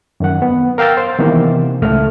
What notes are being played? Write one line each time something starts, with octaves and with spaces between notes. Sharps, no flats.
F#2 D#3 F#5
B3
A#4 F5 G5 E6 A6
C5
C3 D#3 E3 A#3 B3
C#2 A2 A3 F6